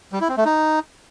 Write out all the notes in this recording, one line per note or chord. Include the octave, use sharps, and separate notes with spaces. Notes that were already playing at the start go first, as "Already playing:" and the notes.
G3
E4
C4
A3
D#4